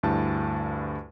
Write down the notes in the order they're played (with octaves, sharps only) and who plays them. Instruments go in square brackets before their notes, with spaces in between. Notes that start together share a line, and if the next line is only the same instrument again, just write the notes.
[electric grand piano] D2 G2 E4 A5